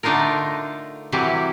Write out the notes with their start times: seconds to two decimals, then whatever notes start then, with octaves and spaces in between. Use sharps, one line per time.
0.03 D3 A3 D4 D#4 F4 A#4
1.12 C3 E3 F#3 G3 G4